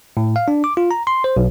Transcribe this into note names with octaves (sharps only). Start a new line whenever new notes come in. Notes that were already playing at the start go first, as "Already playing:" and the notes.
A2
F5
D4
D6
F4
A#5
C6
C5
B1